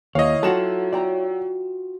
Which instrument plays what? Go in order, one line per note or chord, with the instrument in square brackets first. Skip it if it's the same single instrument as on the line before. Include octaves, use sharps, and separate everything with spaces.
[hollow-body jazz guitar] D#2 [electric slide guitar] E4 C#5 [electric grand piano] D#5 F5
[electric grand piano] F#3 E7 [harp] F4 F#4 F#5 [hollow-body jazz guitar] A4
[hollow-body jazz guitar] D5 G5 A#5